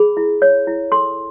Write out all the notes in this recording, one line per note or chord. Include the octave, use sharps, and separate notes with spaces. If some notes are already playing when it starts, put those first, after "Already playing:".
Already playing: G#4 B5
E4
C#5
E4
A4 C6